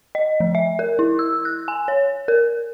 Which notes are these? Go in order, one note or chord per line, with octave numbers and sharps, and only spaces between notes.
D#5
F3
E5
A#4
E4
E6
F#6
G#5
C#5
A#4